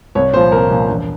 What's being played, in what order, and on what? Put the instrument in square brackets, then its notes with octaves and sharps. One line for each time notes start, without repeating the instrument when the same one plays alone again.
[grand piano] C2 C#5
A#2 F3 C5
C2 A#4
A#2 F3
E1